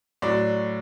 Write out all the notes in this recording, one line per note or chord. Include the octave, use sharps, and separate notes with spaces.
A2 F#3 D5